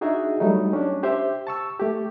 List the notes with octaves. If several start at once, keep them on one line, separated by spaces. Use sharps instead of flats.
D4 D#4 F#4 G#4 E5
F#3 G3 A3 D#4
C#4 D4
G4 C5 E5
A5 C#6 E6
A3 G4